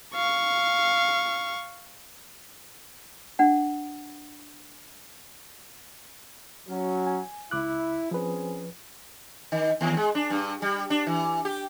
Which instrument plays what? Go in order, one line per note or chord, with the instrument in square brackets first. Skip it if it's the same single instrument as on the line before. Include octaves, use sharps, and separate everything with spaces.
[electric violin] F5 C#6
[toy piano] D4 F#5
[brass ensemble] F#3 C#4
[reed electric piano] G#5
[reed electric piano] C#2 D6 F#6 [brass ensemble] E4
[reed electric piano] F3 B4 [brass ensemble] C4 C#4 G#4
[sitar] D#3
D#2
G#3
D4
G2
G3
D4
E3
G4